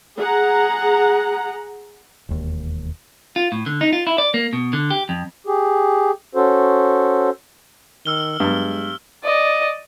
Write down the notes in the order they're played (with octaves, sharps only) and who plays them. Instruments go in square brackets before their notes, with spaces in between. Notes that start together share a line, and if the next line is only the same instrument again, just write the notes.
[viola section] G#4 F#5 A#5
[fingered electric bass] E1 D#2
[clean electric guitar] F4
A2
D3
D#4
F4
E4
D5
A#3
B2
D3
G4
F2
[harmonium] G4 G#4
C#4 F#4 A4 C5
[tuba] D#3 [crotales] E6 F6 G7
[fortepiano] G2 [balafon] F#3 B3 [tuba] G#3
[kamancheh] D5 D#5